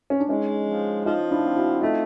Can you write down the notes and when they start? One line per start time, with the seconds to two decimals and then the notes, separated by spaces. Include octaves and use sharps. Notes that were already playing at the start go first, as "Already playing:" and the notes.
0.10 C#4
0.20 D4
0.29 G#3 C#4 D#4
0.67 F3
1.05 F3 D#4 F4
1.31 D4 E4
1.43 C4
1.56 E4 F#4
1.81 A3 D#4 F4